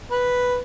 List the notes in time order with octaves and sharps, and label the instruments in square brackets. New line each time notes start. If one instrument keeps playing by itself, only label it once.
[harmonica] B4